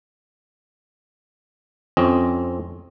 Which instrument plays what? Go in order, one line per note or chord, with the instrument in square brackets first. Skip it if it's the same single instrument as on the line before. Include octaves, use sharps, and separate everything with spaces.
[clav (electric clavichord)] F2 C4 C#4 D#5